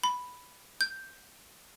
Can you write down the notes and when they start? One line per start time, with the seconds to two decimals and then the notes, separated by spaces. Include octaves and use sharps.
0.03 B5
0.81 G6